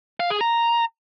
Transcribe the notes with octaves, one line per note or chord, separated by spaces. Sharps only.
F5
G#4
A#5